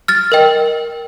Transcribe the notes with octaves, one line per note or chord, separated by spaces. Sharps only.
F6 A6
A#4 D#5 G5